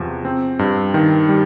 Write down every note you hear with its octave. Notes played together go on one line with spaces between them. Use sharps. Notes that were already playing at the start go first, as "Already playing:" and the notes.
Already playing: E2 C3 F3
C4
G2
D#3
G3